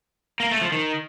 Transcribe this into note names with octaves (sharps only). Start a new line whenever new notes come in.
A#3
A3
F3
D#3